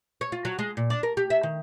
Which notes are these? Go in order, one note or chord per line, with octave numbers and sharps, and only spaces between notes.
C#5
F4
F#3
G#3
A#2
D4
A#4
G4
E5
D#3